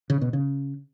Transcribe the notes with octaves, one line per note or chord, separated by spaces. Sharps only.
C#3
B2
C#3